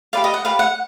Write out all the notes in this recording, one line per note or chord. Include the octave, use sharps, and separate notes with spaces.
G4 B4 D5 F5
D#5
F#5
G4 B4 D5 F5
F#5